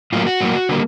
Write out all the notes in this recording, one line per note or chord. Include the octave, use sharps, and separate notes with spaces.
A2 F#3 A#3 F4
F#4
A2 F#3 A#3
D3 G3 A#3